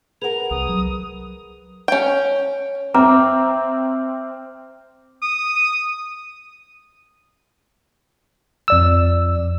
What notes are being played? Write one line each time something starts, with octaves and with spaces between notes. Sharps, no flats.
G#4 A#4 B4 F#5 F7
C2 D#6
F#3
C#4 G5
C4 E5 A#5 D6 F6
D#6
F2 D5 E6